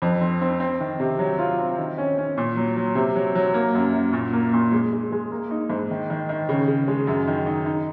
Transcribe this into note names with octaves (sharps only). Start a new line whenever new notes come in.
F2
C4
C4
C4
D#3
C3
F#3
F4
C4
D#3
C#4
C#4
A#2
F#3
F#3
C3
F#3
F#3
A#3
F#2
F#2
A#2
A#3
A#2
G#3
G#3
G#3
A#3
D#4
G#2
D#3
D#3
D#3
C#3
C#3
G#3
F#2
D#3
D#4
D#4